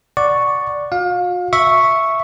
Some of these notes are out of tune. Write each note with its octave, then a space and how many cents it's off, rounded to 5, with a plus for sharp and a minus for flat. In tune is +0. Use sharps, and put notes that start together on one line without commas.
D5 +0 F#5 +0 C#6 +0
F#4 -45 F5 +30
E5 +0 C#6 +0